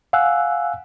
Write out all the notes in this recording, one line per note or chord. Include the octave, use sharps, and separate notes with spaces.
F5 F#5 G#5 E6 F#6